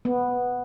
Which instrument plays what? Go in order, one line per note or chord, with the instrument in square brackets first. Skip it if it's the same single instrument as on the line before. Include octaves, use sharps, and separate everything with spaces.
[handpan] B3